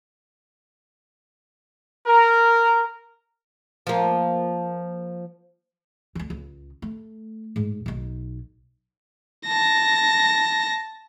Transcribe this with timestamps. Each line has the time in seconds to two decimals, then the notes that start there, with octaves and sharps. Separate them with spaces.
2.07 A#4
3.87 F3 A#3
6.15 D2 D3
6.30 C#2
6.82 A3
7.56 G#2
7.86 B1 D#4
9.46 A5 A#6